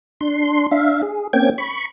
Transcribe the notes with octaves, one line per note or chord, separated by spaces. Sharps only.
D4 C6
D4 E5 F5
G#4
A#3 C4 C#4 G5 G#6
B5 C#6